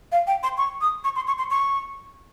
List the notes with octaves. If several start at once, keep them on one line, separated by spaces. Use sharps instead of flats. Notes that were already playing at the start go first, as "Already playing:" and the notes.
F5
G5
C6
C#6
D#6
C#6
C6
C#6
C6
C#6